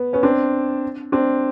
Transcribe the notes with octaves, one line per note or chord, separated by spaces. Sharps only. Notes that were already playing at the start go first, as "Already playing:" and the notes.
Already playing: B3
B3 C#4
C4 D4
C4 D4